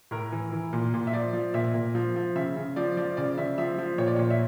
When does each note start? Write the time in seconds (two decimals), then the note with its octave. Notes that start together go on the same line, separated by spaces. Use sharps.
0.11 A2 A#4
0.32 E3
0.52 E3
0.73 A#2
0.94 A#2
1.07 E5
1.13 F3 D5
1.33 F3
1.54 A#2 E5
1.74 A#2
1.95 F3
2.16 F3
2.36 C#3 E5
2.57 C#3
2.76 F3 D5
2.97 F3 D5
3.17 C#3 D5
3.38 C#3 E5
3.58 F3 E5
3.78 F3
3.98 A#2 C#5
4.07 D5
4.16 A#2 C#5
4.30 E5